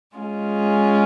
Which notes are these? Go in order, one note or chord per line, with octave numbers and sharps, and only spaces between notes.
G#3 C#4 F4 G#4